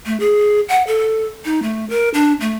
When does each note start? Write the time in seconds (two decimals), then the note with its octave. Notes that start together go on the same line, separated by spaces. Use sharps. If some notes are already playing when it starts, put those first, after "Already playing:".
0.06 A3
0.20 G#4
0.68 F#5
0.87 A4
1.45 D#4
1.62 A3
1.90 A#4
2.14 D4
2.41 A3